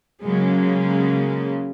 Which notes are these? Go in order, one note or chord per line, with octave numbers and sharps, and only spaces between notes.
C#3 F#3 G#3 A#3